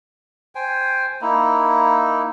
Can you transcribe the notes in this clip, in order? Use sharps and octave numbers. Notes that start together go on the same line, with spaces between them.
C5 G5 G#5
A#3 D#4 E4